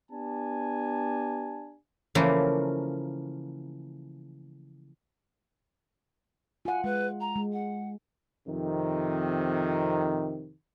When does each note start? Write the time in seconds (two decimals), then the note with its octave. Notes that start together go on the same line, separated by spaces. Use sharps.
0.10 B3 D4 G4 G#5 A5
2.15 C#3 E3 F3 A3 A#3
6.65 F4 F#5 G#5
6.84 G#3 B4
7.20 A#5
7.36 G#3
7.52 F#5
8.48 F2 C3 D#3